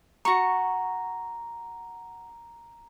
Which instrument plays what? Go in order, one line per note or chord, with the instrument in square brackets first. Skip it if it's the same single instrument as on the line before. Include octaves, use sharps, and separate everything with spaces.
[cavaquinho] F#4 C#6 [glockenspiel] A#5